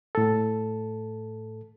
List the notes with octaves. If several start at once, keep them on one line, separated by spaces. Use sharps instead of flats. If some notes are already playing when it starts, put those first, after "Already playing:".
A2 A4